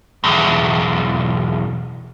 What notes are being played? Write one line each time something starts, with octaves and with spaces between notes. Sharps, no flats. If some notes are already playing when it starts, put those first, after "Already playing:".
B1 E2